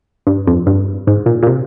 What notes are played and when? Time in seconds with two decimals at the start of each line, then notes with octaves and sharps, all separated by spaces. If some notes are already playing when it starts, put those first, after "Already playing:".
0.27 G2
0.47 F2
0.67 G2
1.07 G#2
1.26 A#2
1.43 A#2
1.47 C3